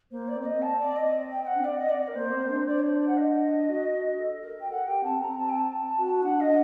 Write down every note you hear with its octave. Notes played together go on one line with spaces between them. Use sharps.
A#3 C5
D5
C4
D5
A#3 D#5
C4
A5
D5
D#5
G5
G5
F#5
D4
C4 D5
D#5
D5
A#4
A#3 C5
C4
D4
D4 D5
C5
D5
F#5
D#5
F#4
F#4
A4
A#4
G5
A4 F#5
G4 G5
C4 A5
C4 A#5
A5
G5
A5
F#4
D4 F#5
D#5
D4